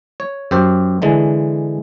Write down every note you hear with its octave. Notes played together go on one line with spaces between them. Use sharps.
C#5
F#2 G4 C5
D3 E3 G#3